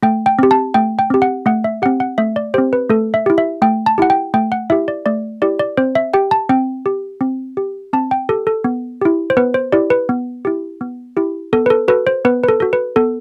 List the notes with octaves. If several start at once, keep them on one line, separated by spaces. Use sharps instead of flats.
A3 G5
G5
C4 G4
A5
A3 G5
G5
C4 G4
F#5
A3 F#5
E5
C4 G4 F#5
F#5
A3 E5
D5
C4 G4 C5
B4
A3 A4
E5
E4 G4
E5
A3 G5
A5
E4 G4 F#5
G5
A3 G5
F#5
E4 G4 E5
D5
A3 D5
E4 G4 D5
D5
C4 C5
E5
G4 G5
A5
C4 G5
G4
C4
G4
C4 A5
G5
G4 A4
A4
B3
E4 G4
C5
B3 B4
C5
E4 G4 D5
B4
B3
E4 G4
B3
E4 G4
B3 A4
B4
A4
F#4 A4 B4
C5
B3 B4
B4
A4
F#4 A4
B4
B3 A4